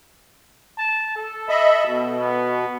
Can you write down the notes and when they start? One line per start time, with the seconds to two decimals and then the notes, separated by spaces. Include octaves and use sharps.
0.78 A5
1.16 A4
1.49 D#5 E5 B5
1.86 B2
2.19 B3